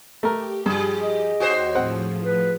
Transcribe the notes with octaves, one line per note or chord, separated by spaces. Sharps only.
A3 G4 A#4
G2 F3 G#4
D#5
D#2 F#4 G#4 C5 C#5 G5
A2 F3 C4 F#5
B4